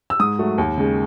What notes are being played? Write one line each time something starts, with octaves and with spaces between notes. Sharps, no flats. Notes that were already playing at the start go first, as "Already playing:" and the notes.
E6
G#2 D#6
F#3 A3
D#2
C#3 G#3